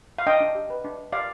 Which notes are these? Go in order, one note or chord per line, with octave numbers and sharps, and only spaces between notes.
F5
D4 D#5 G5
D4
G4
B4
D4
D4
G4 D5 F5